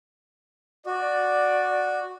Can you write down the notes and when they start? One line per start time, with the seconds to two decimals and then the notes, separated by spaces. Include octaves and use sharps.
0.86 F#4 D5